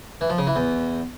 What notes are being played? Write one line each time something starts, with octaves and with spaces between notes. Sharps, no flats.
E3
F3
C#3
E3
E2